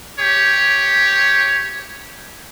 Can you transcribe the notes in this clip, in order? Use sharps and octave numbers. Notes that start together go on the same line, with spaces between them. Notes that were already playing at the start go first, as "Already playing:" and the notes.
G4 C#5